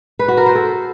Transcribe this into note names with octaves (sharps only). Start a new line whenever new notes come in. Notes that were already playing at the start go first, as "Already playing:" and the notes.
B4
F#4
A#4
C5
A4